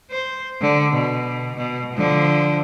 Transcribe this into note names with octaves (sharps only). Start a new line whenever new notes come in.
C5
D3
B2
B2
D3 F3